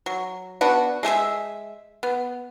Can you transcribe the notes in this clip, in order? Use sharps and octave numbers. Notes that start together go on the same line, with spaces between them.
F#3
B3 D4 F#4
G#3 A3 G#4 E5
B3